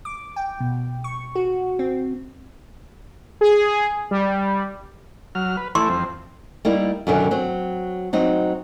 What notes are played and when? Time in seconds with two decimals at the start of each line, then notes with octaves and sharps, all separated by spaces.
0.05 D6
0.36 G5
0.60 B2
1.04 C#6
1.35 F#4
1.79 C4
3.41 G#4
4.11 G3
5.35 F#3 F6
5.57 B4
5.75 E3 A3 E4 C6
5.89 F2 C4
6.65 G3 A#3 D#4 E4
7.07 F#2 B2 D3 D#3 F#3
7.31 F#3 C4
8.13 F#3 C4 D#4